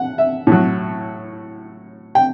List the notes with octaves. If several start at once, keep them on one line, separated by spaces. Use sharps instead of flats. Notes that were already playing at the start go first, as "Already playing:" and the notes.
Already playing: F#5
E5
A2 F#3
G5